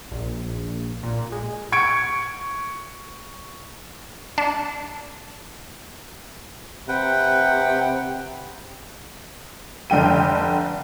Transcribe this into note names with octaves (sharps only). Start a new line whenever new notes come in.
A#1
A#2
G#3
C#6 G#6 C#7 D7
D4
C3 B4 F#5 G5
F1 D3 G5 D#7